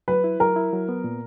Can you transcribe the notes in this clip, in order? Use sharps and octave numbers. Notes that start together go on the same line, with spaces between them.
F#3 B4
E4
F#3 A#4
E4
F#3
B3
A#2